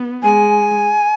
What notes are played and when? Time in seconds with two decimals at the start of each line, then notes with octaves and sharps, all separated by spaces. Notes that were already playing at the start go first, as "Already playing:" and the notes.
Already playing: B3
0.23 G#3 G#5